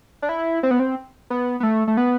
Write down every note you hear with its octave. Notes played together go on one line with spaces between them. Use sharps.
D4
E4
C4
B3
C4
B3
B3
A3
A3
B3